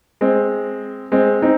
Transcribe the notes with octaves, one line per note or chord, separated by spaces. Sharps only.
G#3 C4
G#3 C4
C4 D#4